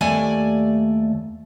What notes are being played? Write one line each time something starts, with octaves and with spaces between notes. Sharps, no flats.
D#2 A3 D5 G#5